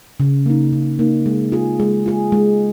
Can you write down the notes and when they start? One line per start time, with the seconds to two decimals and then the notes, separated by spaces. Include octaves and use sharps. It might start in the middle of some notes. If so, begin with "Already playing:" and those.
0.20 C#3
0.46 A#3 D#4
0.73 C#3
0.99 A#3 D#4
1.26 G#3
1.52 F4 G#4
1.80 G#3
2.06 F4 G#4
2.32 G#3